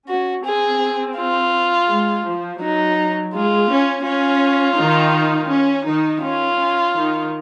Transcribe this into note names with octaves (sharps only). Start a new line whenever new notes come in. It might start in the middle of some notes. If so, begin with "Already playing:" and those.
C#4 F#4
C4 G#4
F4
G#3
F3
F#3 D#4
G#3 F4
C#4
C#4 F4
D#3 D#4
C#4
D#3 D#4
C#4 F4
C#4
D#3 D#4